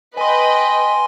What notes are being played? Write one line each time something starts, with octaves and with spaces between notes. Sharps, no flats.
B4 D#5 G5 G#5 C6